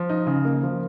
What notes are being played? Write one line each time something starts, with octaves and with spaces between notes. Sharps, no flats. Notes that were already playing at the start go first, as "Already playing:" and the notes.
Already playing: F3
D#4
C#3
A#3
F3